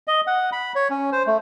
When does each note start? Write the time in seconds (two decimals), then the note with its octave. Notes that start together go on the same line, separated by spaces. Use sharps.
0.07 D#5
0.27 F#5
0.52 B5
0.75 C#5
0.90 C#4
1.12 C5
1.27 A3